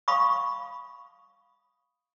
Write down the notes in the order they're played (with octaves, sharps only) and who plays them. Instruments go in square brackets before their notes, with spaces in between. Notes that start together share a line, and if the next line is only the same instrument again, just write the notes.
[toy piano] F5 B5 C#6 D#6